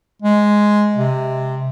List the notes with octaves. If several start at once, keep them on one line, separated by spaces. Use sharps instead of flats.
G#3
C3